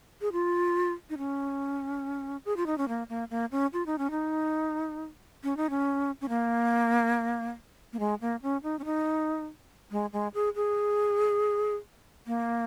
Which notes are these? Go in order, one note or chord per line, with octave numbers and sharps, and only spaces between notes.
G#4
F4
D#4
C#4
G#4
F4
D#4
C#4
A#3
A#3
A#3
C#4
F4
D#4
C#4
D#4
C#4
D#4
C#4
C#4
A#3
A#3
G#3
A#3
C#4
D#4
C#4
D#4
G#3
G#3
G#4
G#4
A#3